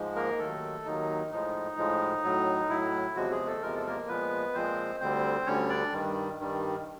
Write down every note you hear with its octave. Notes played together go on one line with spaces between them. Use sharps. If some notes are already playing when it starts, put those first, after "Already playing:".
Already playing: G#2 F3 G#3
A#3 A#4
D#2 D#3 F#3 A3 A4
D#2 D#3 F#3 D#4
A2 F3 G#3 D#4
A2 F3 G#3
A2 F#3
A2 F#3 E4
E2 C3 F3 F#3 G#3 F#4
G#3 G#4
A3 A4
E2 C3 F3 G#3 A#4
A4
A#3 A#4
A#2 F3 G#3 B3 B4
A#2 F3 G#3 C4 C5
D2 D3 G3 C4 C5
D2 D3 G3 C#4 C#5
D4 D5
G2 D#3 G3
G2 D#3 G3